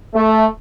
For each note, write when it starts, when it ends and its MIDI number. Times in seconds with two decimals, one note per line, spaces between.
0.14 0.45 57